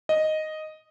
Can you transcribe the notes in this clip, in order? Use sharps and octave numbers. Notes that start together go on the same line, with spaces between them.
D#5